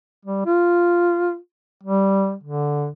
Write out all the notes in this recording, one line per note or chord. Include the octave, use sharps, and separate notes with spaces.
G3
F4
G3
D3